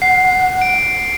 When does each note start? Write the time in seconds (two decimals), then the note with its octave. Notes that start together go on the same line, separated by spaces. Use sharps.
0.02 F#5 C7
0.61 D7